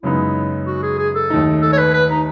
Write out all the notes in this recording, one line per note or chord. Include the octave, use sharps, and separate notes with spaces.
F#2 C#3 G#3 B3 D#4 E4
F#4
G#4
G#4
A4
D#2 D#3 A3 D#4
A4
C#5
B4
B4
D#4